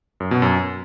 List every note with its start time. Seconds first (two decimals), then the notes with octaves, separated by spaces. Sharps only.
0.20 F#2
0.31 B2
0.42 F#2